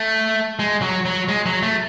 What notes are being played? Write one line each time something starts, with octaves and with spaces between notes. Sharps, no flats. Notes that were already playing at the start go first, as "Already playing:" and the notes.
Already playing: A3
G#3
F#3
F#3
G#3
F#3
A3